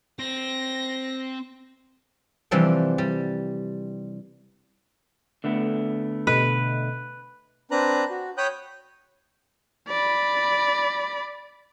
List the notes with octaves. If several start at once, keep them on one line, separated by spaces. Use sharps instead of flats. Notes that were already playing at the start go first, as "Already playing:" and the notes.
C4 A#6
C3 E3 F3 G3 D4 G5
G3
D3 A3 B3
B2 A4 B4 D#5
C4 D4 B4 A#5 F#6
F#4
C#5 G5 B5 D#6 F#6 G6
D5 B5